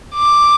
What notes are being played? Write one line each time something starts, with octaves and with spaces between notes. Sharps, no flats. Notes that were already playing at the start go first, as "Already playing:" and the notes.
D6